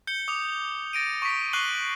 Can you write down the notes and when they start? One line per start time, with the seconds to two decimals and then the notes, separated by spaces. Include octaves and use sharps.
0.07 G6 C#7 G7
0.28 D6 D#6 F7
0.93 A6 A#6 D7 D#7
1.22 C#6 B6
1.53 C#6 F#6 C7 D#7 F#7 G7